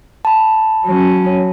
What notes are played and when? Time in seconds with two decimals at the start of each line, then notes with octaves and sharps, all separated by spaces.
0.25 A5 B5
0.85 F#3 C#4